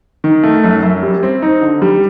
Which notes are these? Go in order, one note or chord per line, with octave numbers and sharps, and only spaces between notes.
D#3
A3
F#2
F#2
G3
C4
D#4
D3
G3